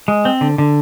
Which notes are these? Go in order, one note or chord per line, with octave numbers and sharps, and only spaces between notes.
G#3
C4
D3
D3